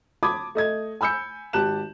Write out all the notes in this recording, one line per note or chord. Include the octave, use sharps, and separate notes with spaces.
A5 B5 D6 D#6 G#6
A3 D#5 G#6
G#5 B5 E6 G6 C#7
G#1 G4 A5 F#6 E7